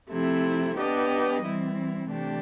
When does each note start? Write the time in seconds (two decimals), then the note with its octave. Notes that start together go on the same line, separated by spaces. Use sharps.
0.10 C3 F3 A3 C4 E4
0.76 B3 D4 G4 B4 D#5
1.43 E3 G3 C4 E4
2.09 C3 E3 A3 D4 G4